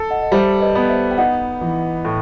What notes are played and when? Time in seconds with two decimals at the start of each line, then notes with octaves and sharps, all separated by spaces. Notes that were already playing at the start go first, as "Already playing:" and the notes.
Already playing: A4
0.10 D#5 F#5
0.23 D#5
0.32 G3 C5 E5
0.60 B4 D#5
0.75 B3
0.89 C5 E5
1.11 G5
1.18 D#4 D#5 F#5
1.61 E3
2.05 A2